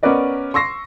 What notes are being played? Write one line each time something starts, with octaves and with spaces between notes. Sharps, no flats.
B3 C#4 A#4 B4 D5 D#5
C6 C#6 E6 A#6 C7